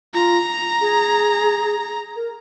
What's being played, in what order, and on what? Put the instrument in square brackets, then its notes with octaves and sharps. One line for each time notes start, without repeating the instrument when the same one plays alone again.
[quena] F4 [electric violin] A#5
[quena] G#4
A#4